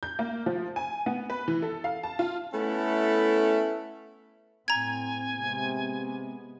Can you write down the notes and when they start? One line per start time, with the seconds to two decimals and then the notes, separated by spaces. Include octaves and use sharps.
0.03 G6
0.19 A#3
0.46 F3
0.76 G#5
1.06 B3
1.30 B4
1.48 E3
1.62 A4
1.84 F5
2.03 A5
2.19 F4
2.53 A3 B3 C#4 E4 A4 B4
4.68 A2 C4 G#5 A#5 G#6
5.39 C3 G#3 B3